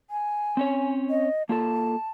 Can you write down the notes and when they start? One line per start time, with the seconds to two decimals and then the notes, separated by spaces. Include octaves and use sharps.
0.10 G#5
0.57 C4 C#4 C#5
1.10 D#5
1.49 A#3 F4 A4 A5